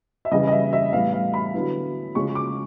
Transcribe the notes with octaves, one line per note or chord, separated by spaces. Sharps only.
E5
C#3 E3 G3 D#5
D#5
E5
E5
A2 E3 G3 B3 F5
F5
B5
D3 F#3 B3 E4
C#3 F3 G#3 C#4 C#6
D6